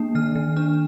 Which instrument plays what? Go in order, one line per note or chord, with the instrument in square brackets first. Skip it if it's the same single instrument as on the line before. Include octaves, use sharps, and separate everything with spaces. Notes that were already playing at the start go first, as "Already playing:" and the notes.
Already playing: [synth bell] A#3 D4
D#3 F6
D#3
D4 F6